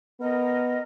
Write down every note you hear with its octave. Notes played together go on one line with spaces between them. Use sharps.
B3 A#4 D#5